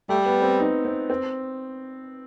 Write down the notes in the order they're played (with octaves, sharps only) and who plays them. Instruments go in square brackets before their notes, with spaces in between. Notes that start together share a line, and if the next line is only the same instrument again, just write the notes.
[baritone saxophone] G3 [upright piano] A3
[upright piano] B3
C4
D#4
C4
C4